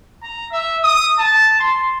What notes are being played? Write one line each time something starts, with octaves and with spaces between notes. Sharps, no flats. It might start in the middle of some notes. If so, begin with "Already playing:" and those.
A#5
E5
D#6
A5
C6